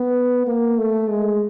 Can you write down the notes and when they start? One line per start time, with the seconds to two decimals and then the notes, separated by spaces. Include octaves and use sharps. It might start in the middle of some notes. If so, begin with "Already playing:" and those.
Already playing: B3
0.47 A#3
0.78 A3
1.09 G#3